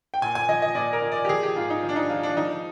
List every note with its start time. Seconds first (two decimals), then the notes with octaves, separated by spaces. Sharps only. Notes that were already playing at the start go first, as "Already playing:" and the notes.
0.14 G5
0.22 A#2 G#5
0.35 G#5
0.49 F3 D#5
0.62 D#5
0.75 A#2 D5
0.93 A#4
1.02 A#2
1.12 D5
1.25 G4
1.29 F3 G#4
1.43 G4
1.56 G#2 F4
1.70 D#4
1.83 F3
1.89 D4
1.96 D#4
2.09 F3 F4
2.23 D4
2.37 F3 D#4